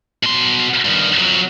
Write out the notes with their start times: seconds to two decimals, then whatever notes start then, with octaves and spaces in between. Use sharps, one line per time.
0.23 B2 C6
0.85 G2 D#3
1.18 F2 F#3